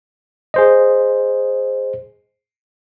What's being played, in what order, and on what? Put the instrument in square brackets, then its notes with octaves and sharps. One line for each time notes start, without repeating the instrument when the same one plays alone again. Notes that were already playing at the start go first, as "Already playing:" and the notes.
[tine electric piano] G#4 C5 D#5